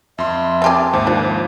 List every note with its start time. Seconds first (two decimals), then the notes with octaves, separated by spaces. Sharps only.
0.18 F2 E5 C6
0.62 C4 G4 G#4 A5 C6 D6
0.93 D#2 G#2 C5
1.07 F3 D4